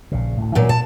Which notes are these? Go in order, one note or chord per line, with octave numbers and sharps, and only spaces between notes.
A#1 C#3
D2 A2
A#2 E3 F#3 A#3 B3
A#2 A5